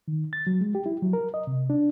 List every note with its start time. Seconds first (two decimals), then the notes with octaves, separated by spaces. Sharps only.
0.08 D#3
0.33 A6
0.47 F#3
0.61 G#3
0.75 G4
0.86 E4
1.02 F#3
1.13 A#4
1.34 D#5
1.47 C3
1.70 D4